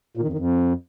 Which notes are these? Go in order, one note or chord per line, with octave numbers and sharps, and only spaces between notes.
A#2
D#3
F2
D#3
F2